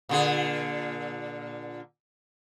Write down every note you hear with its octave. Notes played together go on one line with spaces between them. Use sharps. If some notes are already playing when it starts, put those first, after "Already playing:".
A#2 D3 G#4